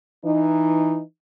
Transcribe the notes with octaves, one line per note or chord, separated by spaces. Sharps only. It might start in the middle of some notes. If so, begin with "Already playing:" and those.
E3 D#4